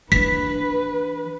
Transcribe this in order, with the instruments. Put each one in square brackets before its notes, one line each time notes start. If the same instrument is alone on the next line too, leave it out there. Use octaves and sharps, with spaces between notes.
[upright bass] E3 D4 [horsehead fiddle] B4 [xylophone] B6